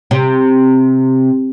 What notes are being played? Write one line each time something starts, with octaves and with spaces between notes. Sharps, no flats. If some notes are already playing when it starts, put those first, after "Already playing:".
C3